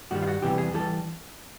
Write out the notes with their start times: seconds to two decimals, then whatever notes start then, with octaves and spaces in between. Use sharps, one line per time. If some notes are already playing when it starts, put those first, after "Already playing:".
0.11 G2 D#3 G3 F#4
0.22 F4
0.27 F#4
0.42 E2 C3 E3 G3 G4
0.58 G#4
0.74 E3 G3 A4